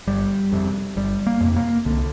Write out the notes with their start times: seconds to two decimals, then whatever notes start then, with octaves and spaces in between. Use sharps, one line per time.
0.07 G1 G3
0.52 F2 C3
0.96 G1 G3
1.27 A#3
1.41 F2 C3
1.56 A#3
1.85 C2 D3